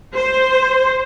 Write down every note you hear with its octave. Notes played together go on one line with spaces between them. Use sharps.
C5